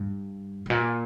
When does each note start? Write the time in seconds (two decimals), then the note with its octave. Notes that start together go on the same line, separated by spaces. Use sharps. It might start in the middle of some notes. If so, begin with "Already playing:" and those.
Already playing: G2
0.66 G2
0.70 A#2